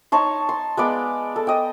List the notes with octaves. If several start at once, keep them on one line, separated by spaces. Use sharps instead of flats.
D#4 C#5 A5 C6
C6
G#3 B3 D5 F5
A4
D#5 G5